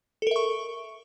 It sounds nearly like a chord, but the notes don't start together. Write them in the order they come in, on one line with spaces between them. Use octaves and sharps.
A4 A#4 E5 C#6